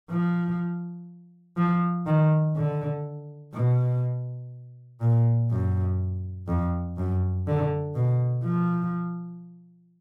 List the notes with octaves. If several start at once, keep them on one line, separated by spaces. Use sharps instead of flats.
F3
F3
D#3
D3
B2
A#2
F#2
F2
F#2
D3
B2
F3